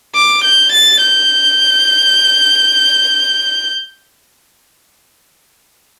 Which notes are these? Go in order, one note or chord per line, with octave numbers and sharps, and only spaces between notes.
D6
G6
A6
G6